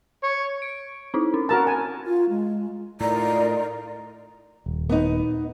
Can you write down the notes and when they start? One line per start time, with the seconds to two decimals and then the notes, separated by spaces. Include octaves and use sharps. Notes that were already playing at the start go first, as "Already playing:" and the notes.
0.24 C#5
0.62 D7
1.14 C4 D#4 E4
1.34 C#4
1.49 F#4 A#4 A5
1.67 G#5
2.06 F4
2.30 G#3
3.01 A2 D#4 F4 A#4 D5 A#5
4.66 D#1
4.89 B3 D#4